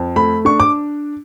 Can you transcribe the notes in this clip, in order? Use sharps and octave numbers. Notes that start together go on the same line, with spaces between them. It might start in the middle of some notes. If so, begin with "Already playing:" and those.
Already playing: F2
A3 B5
D4 C#6
D6